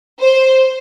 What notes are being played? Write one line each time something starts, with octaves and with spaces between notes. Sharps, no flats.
C5